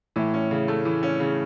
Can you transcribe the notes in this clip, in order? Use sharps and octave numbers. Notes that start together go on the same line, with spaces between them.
A2 E3
C#4
C#3
A3
E3
C#4
C#3